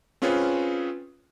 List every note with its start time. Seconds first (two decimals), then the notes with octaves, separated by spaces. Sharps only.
0.22 C4 C#4 F4 G#4 B4 C#5